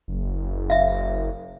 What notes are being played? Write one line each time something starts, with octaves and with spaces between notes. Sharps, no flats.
F#1
E5 F5